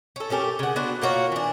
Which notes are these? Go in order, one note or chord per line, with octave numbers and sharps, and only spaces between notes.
C#4 A4
A3 C#4 G4 A#4
C#3 F#5
B3 D4 F#4 C5
A#3 F4 F#4 C#5
E3 D4